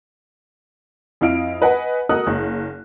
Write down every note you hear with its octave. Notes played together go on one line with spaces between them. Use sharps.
F2 E4 D#5 F5 D7
B4 D#5 F#5 G#5
F#4 A4 A#4 D#5 D#6 F#6
F#1